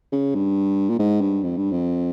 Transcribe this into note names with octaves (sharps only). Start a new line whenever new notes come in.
C#3
G2
A#2
G#2
G2
F2
G2
F2